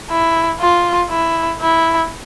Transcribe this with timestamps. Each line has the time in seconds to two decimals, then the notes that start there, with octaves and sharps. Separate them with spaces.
0.11 E4
0.61 F4
1.11 E4
1.62 E4